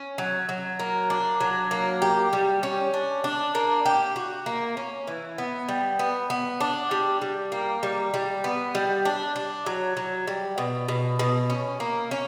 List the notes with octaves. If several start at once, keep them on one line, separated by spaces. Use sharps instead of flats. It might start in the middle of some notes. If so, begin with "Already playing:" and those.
Already playing: C#4
F#3
F#3
A#3
D4
F#3
A#3
G4
G3
C#4
D4
D4
A#3
G4
F#4
A#3
C#4
E3
B3
G3
B3
B3
D4
G3
G3
A#3
G3
G3
B3
G3
D4
D4
F#3
F#3
G3
B2
B2
B2
C#4
A#3
C#4